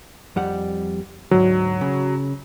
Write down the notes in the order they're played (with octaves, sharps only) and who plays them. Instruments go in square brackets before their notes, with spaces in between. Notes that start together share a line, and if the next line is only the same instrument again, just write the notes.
[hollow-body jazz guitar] F2 G3 F#5
[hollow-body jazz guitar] D2 G#2 [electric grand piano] F#3
[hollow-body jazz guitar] C#3